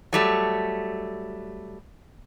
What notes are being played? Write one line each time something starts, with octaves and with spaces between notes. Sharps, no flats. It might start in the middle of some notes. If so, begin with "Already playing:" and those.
F#3 G3 A3